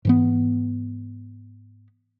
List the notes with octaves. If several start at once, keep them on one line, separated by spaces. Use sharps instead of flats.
G#2 E3 B3